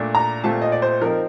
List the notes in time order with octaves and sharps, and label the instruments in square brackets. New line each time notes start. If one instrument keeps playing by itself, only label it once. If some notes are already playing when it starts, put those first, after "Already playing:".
Already playing: [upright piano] A#2 A3 D4
A#5
A#2 A3 C4 F4 A5
D#5
D5
C5
F3 C4 D#4 A#4